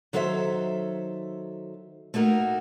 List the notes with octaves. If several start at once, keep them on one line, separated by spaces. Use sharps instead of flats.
D#3 F#3 A4 C5 C#5 E5
A3 A#3 D#4 F#4 A#4